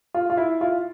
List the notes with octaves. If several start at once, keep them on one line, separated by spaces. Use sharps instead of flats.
F4
F4
E4
F4